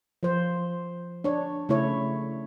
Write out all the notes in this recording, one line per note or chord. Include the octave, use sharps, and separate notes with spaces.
F3 C5
D4 C#5
C#3 A3 E4 C#5